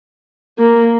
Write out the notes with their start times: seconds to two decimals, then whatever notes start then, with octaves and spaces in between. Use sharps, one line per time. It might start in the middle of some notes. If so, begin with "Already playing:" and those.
0.58 A#3